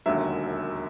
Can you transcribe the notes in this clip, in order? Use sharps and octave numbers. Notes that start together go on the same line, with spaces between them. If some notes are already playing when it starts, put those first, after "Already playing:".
E1 D#2 D3 F#3 E5